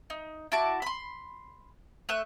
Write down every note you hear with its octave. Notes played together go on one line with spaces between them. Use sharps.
D#4
E4 F#4 A5 D6
B5 C6
A3 E5 F#6